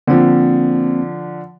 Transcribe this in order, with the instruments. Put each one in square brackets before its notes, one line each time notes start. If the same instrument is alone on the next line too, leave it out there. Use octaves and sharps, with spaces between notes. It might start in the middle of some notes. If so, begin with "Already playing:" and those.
[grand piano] D3 F3 [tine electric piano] A#3 C4